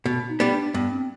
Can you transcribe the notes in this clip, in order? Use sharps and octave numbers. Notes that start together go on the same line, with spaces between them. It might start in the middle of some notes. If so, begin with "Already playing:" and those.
B2
D#4
G3 B3
D4
G2 B3
C4